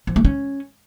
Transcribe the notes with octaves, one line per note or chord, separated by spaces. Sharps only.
F3
A3
C#4